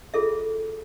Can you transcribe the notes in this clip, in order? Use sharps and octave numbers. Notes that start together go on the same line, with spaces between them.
F4 G#4 A4 E5